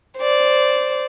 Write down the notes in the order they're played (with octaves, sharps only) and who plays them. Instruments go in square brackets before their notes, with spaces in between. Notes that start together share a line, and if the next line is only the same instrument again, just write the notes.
[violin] C5 D5